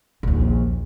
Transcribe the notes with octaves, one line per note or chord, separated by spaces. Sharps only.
A#1 D#2